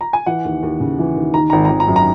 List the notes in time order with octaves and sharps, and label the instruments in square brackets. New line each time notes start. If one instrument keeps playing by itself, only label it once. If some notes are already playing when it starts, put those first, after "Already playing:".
[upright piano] A#5
G#5
E3 F#5
D#2
D#2
C#3
E3
D#2
D#3 A#5
G#1 A#5
A#5
G#1
A#5
F#2
A#5